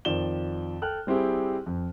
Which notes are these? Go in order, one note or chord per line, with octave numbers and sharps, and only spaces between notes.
F2 D#3 F3 D5 E7 G7
A4 G5 F6 F#6
G3 C4 E4 G4 G#4
F2